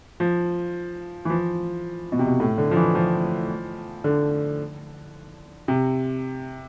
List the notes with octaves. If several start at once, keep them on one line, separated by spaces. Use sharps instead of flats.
F3
E3
F3
B2
C3
B2
A2
D3
F3
E3
F3
D3
C3